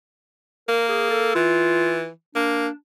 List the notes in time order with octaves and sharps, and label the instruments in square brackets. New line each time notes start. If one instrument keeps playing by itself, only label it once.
[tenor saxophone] A#3 [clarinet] A#4
[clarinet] G#4
A4
[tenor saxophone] E3 [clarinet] F4
[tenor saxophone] A#3 [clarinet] D4